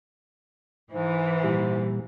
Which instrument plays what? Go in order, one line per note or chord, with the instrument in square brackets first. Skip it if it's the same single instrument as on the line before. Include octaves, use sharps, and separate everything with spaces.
[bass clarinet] G#2 [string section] E3
[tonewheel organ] A#2 G3